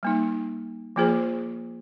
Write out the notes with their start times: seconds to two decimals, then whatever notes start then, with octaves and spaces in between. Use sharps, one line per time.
0.03 G3 A#3 D#4
0.96 F3 A#3 F4 G#4 C5